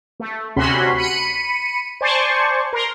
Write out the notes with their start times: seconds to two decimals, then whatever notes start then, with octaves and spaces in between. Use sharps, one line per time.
0.20 A3
0.56 D2 C3 C#4 F#4 B5 C6
0.97 B5 C#7 D#7
2.01 C5 D5 G#5 A5 C6 C#6
2.73 A#4 C6